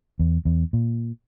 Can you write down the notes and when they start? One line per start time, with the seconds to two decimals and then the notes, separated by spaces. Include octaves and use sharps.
0.19 E2
0.45 E2
0.73 A#2